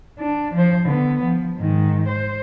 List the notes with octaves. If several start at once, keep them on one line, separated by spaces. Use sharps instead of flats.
D4
F3 C5
D3 B3
F3
G#2 D#3
C5